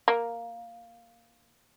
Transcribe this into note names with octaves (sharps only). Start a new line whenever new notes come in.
A#3